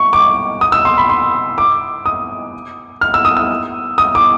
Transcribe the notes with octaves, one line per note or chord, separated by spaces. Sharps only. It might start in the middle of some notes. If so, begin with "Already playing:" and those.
Already playing: C#6
D6
D#6
E6
C6
B5
C6
D6
D#6
F6
E6
D#6
E6
D#6
D6